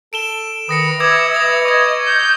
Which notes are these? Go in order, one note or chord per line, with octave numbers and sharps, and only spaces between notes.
A4 D7 E7 G7
D#3 B4 D#6 A#6 C#7
B4 E5 D6 E6 G#6
D#6 A#6 F7
D#5 C#6 G#6
G6